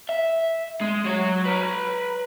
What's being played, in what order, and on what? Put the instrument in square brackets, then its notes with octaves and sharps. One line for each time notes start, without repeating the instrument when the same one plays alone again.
[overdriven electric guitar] E5
G#3
F#3 C#5
B4 A#5